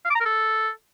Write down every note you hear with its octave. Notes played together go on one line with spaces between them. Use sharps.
F5
D6
A#5
A#4
A4